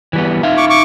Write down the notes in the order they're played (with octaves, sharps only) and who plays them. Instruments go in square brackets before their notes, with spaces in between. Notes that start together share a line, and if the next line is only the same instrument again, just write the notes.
[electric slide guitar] E3 G3 B3
D#4 E5 F5
[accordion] C#6 D6
C#6 D6